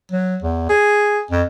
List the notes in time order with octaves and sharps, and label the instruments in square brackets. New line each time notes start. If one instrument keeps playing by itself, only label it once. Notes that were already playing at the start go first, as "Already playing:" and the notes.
[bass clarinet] F#3
E2
G#4
F2